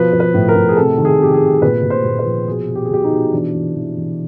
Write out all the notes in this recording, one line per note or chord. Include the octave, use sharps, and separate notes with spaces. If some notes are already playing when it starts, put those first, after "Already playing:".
Already playing: B2 F3 B4
F3
B4
A2
A#4
A2
G#4
C3 A4
D#3
G#4
C3 G4
G#4
C3
A#2 B4
A#2
C5
A#2
B4
F3
B2 G#4
B2
G4
G#4
B2 G4
D#4
B2
E3 D4
E3
E3
E3